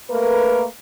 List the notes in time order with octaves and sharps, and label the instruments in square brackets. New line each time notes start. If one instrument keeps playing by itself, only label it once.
[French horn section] A3 A#3 A#4 B4